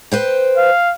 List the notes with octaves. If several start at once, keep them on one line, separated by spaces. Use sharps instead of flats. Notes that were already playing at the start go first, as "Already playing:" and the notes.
B4 C5 G5
F5